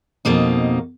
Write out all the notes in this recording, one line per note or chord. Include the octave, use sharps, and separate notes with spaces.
F2 B2 A#3 D#4